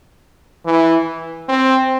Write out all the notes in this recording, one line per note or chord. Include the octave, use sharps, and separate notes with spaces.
E3
C4